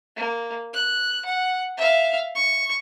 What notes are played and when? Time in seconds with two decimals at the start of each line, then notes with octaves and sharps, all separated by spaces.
0.16 A#3
0.73 F#6
1.25 F#5
1.77 E5 F5
2.35 C#6